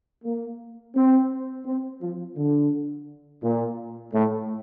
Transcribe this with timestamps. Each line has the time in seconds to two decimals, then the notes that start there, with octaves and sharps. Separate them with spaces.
0.24 A#3
0.95 C4
1.65 C4
2.01 F3
2.36 D3
3.42 A#2
4.13 A2